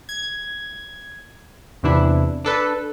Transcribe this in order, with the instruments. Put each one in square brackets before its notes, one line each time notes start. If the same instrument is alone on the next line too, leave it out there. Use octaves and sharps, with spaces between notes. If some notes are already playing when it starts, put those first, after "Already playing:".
[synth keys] G#6
E2 C3 E3 D4 E4
D4 A4 B4